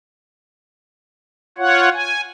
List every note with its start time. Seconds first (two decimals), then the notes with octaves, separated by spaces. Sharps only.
1.58 F4 C#5 F#5
1.93 G#5